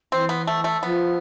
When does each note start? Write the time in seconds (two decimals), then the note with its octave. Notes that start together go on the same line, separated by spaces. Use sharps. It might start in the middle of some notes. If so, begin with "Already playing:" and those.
0.12 E3 C4
0.29 B3
0.47 A3
0.64 A3
0.83 F3 B3